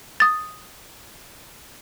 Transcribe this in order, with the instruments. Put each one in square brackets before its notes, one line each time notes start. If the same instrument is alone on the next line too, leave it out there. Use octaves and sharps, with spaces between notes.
[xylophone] D#6 A6